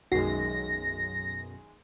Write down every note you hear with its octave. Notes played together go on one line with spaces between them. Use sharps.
B1 F#2 D#3 G#3 F#4 A#6 C7